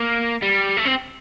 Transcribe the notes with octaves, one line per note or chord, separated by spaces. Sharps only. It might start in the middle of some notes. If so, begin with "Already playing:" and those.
Already playing: A#3
G3
A3
C4